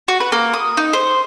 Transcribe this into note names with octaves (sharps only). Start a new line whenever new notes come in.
F#4
B4
A#3
D#6
D#4
C5